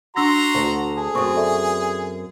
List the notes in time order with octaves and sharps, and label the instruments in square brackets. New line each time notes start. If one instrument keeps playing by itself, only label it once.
[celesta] D4 E6 A#6 [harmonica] F#4 A#5 C6
[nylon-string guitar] D2
[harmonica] G#4 [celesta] A5
[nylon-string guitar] F#2 C4 [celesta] C#6 D#6
[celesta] A4 D5 E5